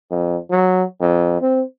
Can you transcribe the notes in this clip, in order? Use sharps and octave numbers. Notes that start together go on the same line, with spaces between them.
F2
F#3
F2
C4